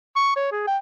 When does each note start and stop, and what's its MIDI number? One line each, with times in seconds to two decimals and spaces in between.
0.16 0.35 85
0.36 0.51 73
0.52 0.63 68
0.67 0.78 79